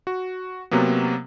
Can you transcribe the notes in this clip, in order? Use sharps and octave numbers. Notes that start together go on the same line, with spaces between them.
F#4
C3 F#3 A#3 B3